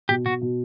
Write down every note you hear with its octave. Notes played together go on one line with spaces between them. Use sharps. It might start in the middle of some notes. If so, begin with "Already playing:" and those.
B2 G4
B2 F#4
B2